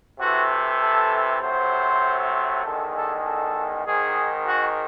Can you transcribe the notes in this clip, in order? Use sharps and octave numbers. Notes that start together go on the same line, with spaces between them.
C3 E3 A3 F#4
A4
C3 F#3 A3 C5
E2 D#3 G#3 A4
A4
A4
G#2 D#3 G#3 G#4
F#4